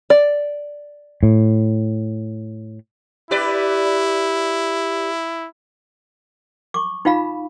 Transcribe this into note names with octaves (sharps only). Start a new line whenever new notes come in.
D5
A2
E4 G4 B4 D5
C#6 D6
D#4 F4 F5 B5